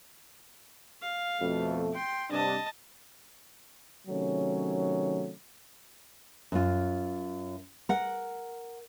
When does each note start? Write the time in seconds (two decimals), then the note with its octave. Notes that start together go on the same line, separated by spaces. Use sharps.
1.02 F5
1.42 F2 B2 A3
1.93 G5 C6
2.31 G2 C3 D4 D#5 A5
4.08 C3 D#3 F#3 A3 C#4
6.52 F#2 F4
7.89 A#4 F#5